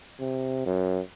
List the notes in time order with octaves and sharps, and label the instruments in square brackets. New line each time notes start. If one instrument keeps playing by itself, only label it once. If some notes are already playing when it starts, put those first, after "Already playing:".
[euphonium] C3
F#2